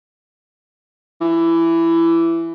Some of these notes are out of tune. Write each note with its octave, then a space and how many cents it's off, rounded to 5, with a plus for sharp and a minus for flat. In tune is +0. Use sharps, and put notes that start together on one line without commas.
E3 +15